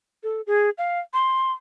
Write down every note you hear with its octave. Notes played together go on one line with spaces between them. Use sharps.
A4
G#4
F5
C6